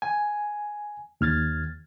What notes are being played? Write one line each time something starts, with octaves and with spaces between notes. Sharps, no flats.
G#5
D#2 F6 G#6 A6